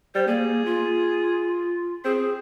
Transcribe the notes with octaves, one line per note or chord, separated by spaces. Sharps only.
G3 C5
A#3 G#4
F4
C4 G#4